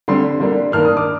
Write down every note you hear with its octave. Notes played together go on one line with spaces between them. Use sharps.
D3 G3 C4 C6
D3 G3 A#3 D4
G2 D#3 A#3 D4 F6
D#6
D6